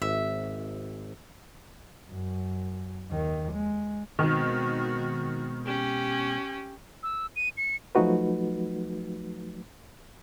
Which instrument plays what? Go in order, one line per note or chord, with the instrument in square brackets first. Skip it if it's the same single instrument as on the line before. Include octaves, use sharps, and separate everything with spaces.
[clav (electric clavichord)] G#1 [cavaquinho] E5
[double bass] F#2
D#2 D#3
G#3
[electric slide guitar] B2 G#3 C4 [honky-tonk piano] D#3 [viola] F#4
[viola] C#4 G4
[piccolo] E6
D#7
C#7
[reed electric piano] F3 F#3 A3 D#4 F#4 B4